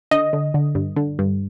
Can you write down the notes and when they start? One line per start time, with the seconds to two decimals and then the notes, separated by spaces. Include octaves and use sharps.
0.11 D3 D#5
0.33 D3
0.54 D3
0.75 G2
0.96 D3
1.19 G2